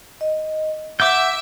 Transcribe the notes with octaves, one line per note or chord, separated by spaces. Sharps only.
D#5
E5 F#5 D6 G6